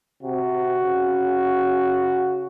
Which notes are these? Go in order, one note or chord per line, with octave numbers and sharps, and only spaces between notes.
C3 F#4
C#3